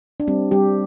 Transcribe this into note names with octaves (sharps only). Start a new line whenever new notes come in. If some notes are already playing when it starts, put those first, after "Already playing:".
D4
G3 C4
G3 G4